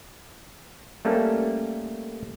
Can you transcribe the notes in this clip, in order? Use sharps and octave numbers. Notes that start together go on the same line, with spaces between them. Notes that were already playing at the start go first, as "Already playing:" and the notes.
G3 A3 A#3 C#4 A4